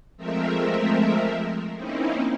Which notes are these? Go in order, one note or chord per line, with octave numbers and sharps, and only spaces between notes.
F3 G#3 A3 C4 A#4 E5
A#3 C4 C#4 D#4 E4